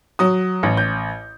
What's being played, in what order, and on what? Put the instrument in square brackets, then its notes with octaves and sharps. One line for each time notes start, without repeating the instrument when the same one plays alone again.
[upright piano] F#3 D#6
A1
G6